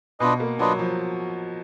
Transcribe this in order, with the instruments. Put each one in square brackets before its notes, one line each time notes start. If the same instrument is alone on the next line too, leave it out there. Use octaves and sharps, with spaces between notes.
[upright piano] B2 [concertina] D4 F4 B4 D#5
[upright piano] A#3
[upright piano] F#3 [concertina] D4 F4 B4 D#5
[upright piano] F3